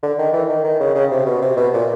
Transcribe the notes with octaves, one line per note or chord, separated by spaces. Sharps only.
D3
D#3
E3
D#3
D#3
C#3
C#3
C3
B2
C3
B2
A#2